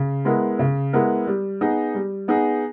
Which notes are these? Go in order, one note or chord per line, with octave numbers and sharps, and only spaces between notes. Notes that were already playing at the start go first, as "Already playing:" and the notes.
Already playing: C#3
G#3 B3 E4 A#4
C#3
G#3 B3 E4 A#4
G3
B3 D#4 G#4
G3
B3 D#4 G#4